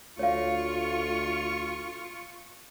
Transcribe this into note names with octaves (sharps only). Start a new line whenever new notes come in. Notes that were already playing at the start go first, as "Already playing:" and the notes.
D2 F4 C#5 F5 C#6